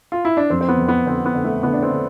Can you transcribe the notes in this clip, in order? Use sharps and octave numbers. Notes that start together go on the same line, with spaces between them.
F4
E4
D4
F2 C4
C4
B3
F2
B3
D3 C4
B3
D3
A3
D3 B3
D4
C4
D3